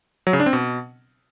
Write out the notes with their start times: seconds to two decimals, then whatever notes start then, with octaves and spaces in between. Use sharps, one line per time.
0.27 F#3
0.33 C#3
0.40 D4
0.46 C4
0.53 B2